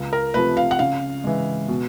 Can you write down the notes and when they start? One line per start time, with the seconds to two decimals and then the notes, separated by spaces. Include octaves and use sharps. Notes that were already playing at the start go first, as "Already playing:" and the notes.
Already playing: C#2
0.13 A#4
0.34 C3 F3 A3 B4
0.57 F5
0.71 F#5
0.79 C#3 F5
1.24 E3 G#3
1.68 B2